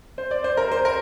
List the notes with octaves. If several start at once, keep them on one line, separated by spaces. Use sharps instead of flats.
C5
D5
C5
A#4
C5
A#4